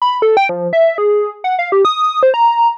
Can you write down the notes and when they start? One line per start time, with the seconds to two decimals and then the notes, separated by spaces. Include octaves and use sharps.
0.02 B5
0.22 A4
0.37 G5
0.49 F3
0.73 E5
0.98 G#4
1.44 F#5
1.59 F5
1.72 G4
1.85 D#6
2.23 C5
2.34 A#5